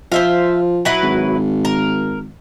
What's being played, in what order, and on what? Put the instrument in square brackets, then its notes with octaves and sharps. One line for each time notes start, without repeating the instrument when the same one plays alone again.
[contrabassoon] F3 [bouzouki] C5 E5 F5
[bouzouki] F#3 E4 B4
[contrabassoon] G#1
[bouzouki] A#4